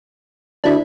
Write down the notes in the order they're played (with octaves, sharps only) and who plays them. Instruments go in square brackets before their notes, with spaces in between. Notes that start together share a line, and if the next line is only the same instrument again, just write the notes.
[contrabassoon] D2 [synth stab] D4 E4